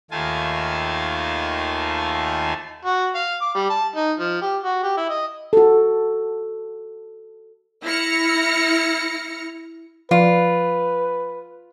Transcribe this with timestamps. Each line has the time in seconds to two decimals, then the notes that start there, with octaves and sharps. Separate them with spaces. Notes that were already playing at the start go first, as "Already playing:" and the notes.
0.11 D#2 D#3 A3 F4 G#5 A5
2.85 F#4
3.15 F5
3.41 D6
3.55 G3
3.70 A5
3.96 D#4
4.19 F3
4.42 G4
4.63 F#4
4.83 G4
4.97 E4
5.09 D#5
5.53 F#4 A4
7.84 E4 F6 A#6 C#7
10.11 F3 F4 B4 D5